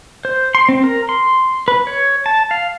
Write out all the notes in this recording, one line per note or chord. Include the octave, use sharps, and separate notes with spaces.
C5
C6
C4
A#4
C6
B4
C#5
A5
F5